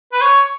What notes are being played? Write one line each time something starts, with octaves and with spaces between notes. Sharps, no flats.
B4
C#5